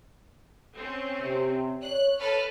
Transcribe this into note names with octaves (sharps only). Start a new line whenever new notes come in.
C4 C#4
C3
C#5 F#6
A4 B4 F6